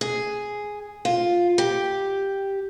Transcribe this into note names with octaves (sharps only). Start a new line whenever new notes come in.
G#4
F4
G4